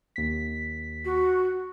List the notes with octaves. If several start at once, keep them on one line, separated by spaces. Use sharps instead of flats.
D#2 B6
F#4